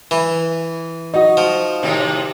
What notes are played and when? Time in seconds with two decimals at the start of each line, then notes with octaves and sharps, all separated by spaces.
0.11 E3
1.14 D#4 F#4 D#5
1.37 F3
1.83 A2 C3 D#3